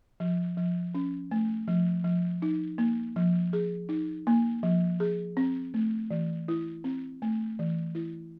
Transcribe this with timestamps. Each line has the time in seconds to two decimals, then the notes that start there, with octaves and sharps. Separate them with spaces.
0.20 F3
0.57 F3
0.95 C#4
1.31 A3
1.68 F3
2.04 F3
2.42 D#4
2.78 A#3
3.16 F3
3.53 G#4
3.89 D#4
4.27 A#3
4.63 F3
5.00 G#4
5.37 C4
5.74 A3
6.11 E3
6.48 E4
6.84 C4
7.22 A3
7.59 E3
7.95 E4